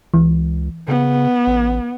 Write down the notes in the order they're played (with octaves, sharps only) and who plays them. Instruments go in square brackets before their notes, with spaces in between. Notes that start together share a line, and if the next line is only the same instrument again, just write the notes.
[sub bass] C#2 [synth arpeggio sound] E3
[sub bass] C#3 [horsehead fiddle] B3
[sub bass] A1